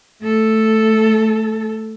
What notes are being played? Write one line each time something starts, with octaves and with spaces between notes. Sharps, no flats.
A3 A4